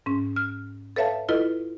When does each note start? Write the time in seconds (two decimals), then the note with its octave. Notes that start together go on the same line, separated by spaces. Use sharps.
0.06 G#2 C#4
0.36 F6
0.96 A4 B4 C#5 E5 F5 A5
1.29 E4 F4 A4 B4 D#5